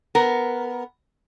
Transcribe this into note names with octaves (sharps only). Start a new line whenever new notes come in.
B3 A#4